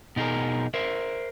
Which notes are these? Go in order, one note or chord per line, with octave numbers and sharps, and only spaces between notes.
B2 D#4 G4 G#4 A#4
A#4 C5 E5